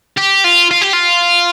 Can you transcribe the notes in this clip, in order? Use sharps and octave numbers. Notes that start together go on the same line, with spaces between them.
G4
F4
F4
G4
F4